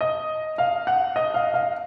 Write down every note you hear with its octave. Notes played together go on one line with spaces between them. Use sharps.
D#5
F5
F#5
D#5
F5
F5